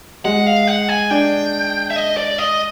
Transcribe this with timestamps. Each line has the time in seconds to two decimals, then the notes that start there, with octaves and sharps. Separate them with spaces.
0.25 G#3 F#5
0.46 F5
0.68 F#5
0.89 G#5
1.10 D4 G5
1.90 E5
1.96 D#5
2.17 D5
2.38 D#5